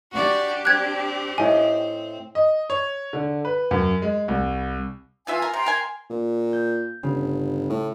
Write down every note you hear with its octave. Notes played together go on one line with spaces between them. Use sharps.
D4 F#4 G4 D5
C4 F#6 G#6
A2 D#5 G#5
D#5
C#5
D3
B4
F#2
G#3
C2
B2 E3 F4 E5 G#5
A#4
C3 G5 A#5 C6
A#4 G#5
A#2
G6
G1 C#3
A2